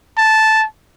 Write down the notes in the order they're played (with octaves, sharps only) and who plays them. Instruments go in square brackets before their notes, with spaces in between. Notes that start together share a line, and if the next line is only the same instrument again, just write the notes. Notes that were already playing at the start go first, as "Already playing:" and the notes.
[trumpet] A5